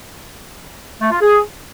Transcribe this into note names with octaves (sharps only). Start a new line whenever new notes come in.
A3
F4
G#4